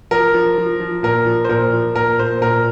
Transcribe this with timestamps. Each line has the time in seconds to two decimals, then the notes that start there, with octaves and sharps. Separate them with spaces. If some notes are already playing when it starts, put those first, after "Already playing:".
0.11 F3 A#4
0.34 F3
0.58 F3
0.80 F3
1.03 A#2 A#4
1.26 F3
1.44 C5
1.49 A#2 A#4
1.73 F3
1.96 A#2 A#4
2.19 A#2 C5
2.41 A#2 A#4